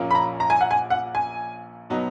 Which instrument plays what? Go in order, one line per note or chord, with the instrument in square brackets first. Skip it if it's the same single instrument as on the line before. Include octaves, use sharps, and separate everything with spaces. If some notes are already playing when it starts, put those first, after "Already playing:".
Already playing: [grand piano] A#1 A#2 A#3 C#4
[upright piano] B5
A#5
A#5
G#5
F#5
G#5
F#5
G#5
[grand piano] B2 F#3 B3 D#4